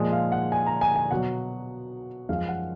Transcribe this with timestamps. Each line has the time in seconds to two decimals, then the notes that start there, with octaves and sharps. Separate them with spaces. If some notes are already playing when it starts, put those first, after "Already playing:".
Already playing: A#2 F3 G#3
0.13 F5
0.32 F#5
0.52 G#5
0.66 A#5
0.81 G#5
0.96 G#5
1.11 B2 F#3 F#5
2.29 F#2 F3 G#3 F5
2.49 F#5